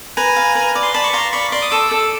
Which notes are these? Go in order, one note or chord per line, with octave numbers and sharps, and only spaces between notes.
B4 G#5 A#5
F5
B4
D5
C6
D5 A5 B5
C#6
F5 A#5 C6
D5 B5 C#6
D5 C6 D6
D#6
A4 D6 E6
A4